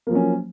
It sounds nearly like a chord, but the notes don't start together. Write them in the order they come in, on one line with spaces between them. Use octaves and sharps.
A#3 F3 F#3 C#4